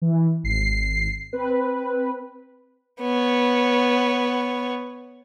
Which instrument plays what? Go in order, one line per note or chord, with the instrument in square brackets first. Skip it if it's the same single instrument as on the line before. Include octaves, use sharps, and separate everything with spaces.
[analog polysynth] E3
G#1 C7
C4 B4
[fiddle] B3 C#5